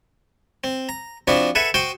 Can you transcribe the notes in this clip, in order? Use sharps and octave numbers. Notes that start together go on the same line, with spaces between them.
C4
A#5
F3 C4 D4 E4 F#4
A4 B4 E5 F#5 G#5
F#4 C5 G5 D#6